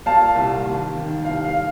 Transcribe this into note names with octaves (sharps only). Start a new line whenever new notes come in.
A#2 F5 A5
C2
D#2
D#3
C2 F5
F5